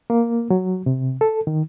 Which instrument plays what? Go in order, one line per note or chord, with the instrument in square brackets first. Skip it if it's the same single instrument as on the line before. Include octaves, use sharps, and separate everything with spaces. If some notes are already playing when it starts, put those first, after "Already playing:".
[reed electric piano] A#3
F#3
C3
A4
D#3